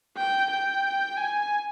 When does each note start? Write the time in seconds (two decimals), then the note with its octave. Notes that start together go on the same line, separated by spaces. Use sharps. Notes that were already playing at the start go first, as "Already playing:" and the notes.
0.17 G5
0.51 G5
1.17 G#5